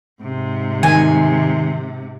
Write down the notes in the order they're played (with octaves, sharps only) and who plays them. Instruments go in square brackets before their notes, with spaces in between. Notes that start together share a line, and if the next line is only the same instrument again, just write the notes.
[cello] G#2 C3
[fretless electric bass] D#3 [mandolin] G#5